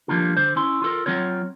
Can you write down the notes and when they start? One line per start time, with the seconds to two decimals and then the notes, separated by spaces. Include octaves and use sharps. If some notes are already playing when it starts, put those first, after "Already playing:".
0.08 F3 G3 A#3 D4 F4
0.37 D3 C5
0.56 C#4 E4 C6
0.82 F4 A4 A#4
1.06 F#3 C4 F4 C#5